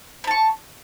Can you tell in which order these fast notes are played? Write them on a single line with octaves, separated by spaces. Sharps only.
B5 A5 C#6